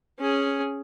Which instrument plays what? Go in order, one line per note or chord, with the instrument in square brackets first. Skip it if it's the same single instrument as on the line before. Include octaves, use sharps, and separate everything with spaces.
[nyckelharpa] C#4 G#4